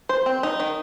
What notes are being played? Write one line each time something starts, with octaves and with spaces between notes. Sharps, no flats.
C5
C4
D#4
D#3